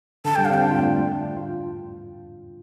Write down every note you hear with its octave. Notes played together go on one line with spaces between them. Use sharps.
D3 A5
D3 G3 G5
F5
G3 C4
G5
D4
F4
A3 D4
F4